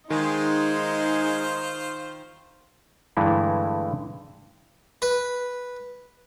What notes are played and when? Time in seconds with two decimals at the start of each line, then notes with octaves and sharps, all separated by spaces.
0.10 D#3 G#3 D#4 F4 C5
3.17 G2 D3 E3 G#3 A3 E4
5.02 B4